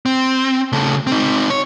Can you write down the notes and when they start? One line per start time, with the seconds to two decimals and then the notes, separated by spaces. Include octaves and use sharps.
0.06 C4
0.72 C#3 A3
1.07 C4 D#4
1.50 C#5